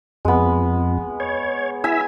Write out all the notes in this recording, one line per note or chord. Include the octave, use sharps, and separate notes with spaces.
F2 G#3 B3
C#5
E4 E5 G#5